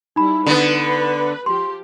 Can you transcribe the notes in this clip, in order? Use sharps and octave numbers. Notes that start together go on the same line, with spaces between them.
G3 D#4 E4 B5
D3 B3 B4
F3 G4 C6